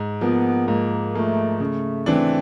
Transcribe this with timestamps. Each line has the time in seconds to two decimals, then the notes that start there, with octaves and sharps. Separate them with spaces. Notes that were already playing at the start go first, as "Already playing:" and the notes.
Already playing: G#2
0.21 F3 A#3 B3
0.67 G#2 A#3
1.14 F3 A3 A#3
1.60 C#3 A3
2.06 E3 A3 C4 D4